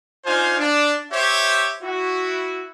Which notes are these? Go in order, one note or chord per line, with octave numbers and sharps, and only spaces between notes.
D4 D#4 F4 C5 F5 G#5
D4
G4 C5 C#5 E5
E4 F#4